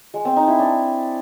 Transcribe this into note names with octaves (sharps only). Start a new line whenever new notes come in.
G#3
C4
D#4
E4
D4